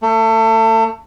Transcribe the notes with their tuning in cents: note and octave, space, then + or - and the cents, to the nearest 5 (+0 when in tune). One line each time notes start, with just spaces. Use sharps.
A3 +30